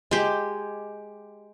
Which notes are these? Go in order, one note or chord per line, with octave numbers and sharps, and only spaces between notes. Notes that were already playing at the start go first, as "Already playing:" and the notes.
G#3 G4